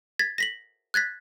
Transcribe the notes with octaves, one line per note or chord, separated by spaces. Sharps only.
G#6 A6 B6
A#6 B6 F#7
F#6 G#6 A6 B6